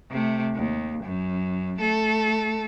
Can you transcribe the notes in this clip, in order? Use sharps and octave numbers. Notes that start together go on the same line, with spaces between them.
C3 A3
D#2
F#2
A3 A4